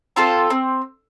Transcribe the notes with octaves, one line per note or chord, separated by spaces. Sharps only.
C4 F4 A4 C5
C4